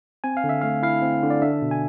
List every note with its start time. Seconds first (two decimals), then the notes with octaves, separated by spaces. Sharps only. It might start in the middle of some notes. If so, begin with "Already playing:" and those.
0.24 C4 G#5
0.37 F5
0.44 D3
0.49 E5
0.62 A3 F5
0.83 E4 F5
1.02 C4
1.22 D3
1.30 D5
1.42 D4 E5
1.62 B2
1.71 G#5